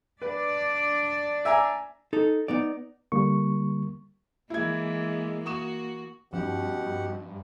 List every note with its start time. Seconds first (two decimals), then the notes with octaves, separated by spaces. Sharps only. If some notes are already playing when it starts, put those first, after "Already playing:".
0.22 D4 B4 D5
1.45 E5 G#5 A#5
2.13 D#4 A4
2.48 B3 D#4 D5
3.12 D3 G3 A#3 C#6
4.50 E3 G#3 A#3 E4 G#6
5.46 A#3 F#4 C#6 D#6 E7
6.33 G2 B2 F3 C#4 D#4 G4 F#5